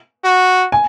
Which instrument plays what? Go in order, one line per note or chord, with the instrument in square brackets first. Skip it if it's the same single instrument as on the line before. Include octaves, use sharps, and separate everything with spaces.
[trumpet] F#4
[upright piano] G#5